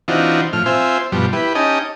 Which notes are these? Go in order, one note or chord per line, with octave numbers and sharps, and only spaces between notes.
E3 C4 D4 D#4 F4 F#4
A2 F3 F6
C4 F4 C5 E5 G#5
G2 B2 F3 G3
E4 G4 B4
C#4 D#4 G4 D#5 G#5 A5